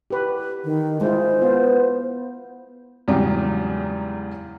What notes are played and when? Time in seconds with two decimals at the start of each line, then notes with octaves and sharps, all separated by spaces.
0.10 G4 B4
0.64 D#3
1.01 G#3 E4 F4 C5
1.42 B3 F4
3.08 E2 G#2 C#3 F#3 G3